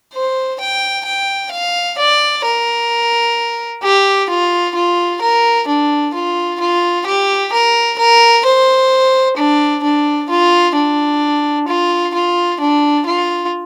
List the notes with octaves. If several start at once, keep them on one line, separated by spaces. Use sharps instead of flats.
C5
G5
G5
F5
D5
A#4
G4
F4
F4
A#4
D4
F4
F4
G4
A#4
A#4
C5
D4
D4
F4
D4
F4
F4
D4
F4